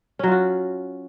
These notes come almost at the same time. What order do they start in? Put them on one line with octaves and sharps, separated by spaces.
C#4 F#3 F4 F#4